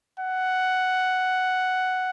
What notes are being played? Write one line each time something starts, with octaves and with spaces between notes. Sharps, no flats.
F#5